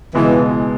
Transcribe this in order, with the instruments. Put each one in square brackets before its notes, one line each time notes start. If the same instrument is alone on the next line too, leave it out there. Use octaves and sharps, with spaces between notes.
[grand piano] C#2 B2 G#3 [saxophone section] E3